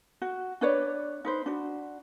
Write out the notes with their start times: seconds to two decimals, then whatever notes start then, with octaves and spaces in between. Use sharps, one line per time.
0.22 F#4
0.61 D4 B4 C#5 D5
1.25 D#4 B4 C5
1.46 D4 F#4